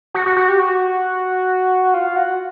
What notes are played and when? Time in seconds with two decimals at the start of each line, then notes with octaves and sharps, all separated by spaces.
0.14 F#4
0.26 F#4
0.36 F#4
0.48 G4
0.59 F#4
1.94 F4
2.16 F#4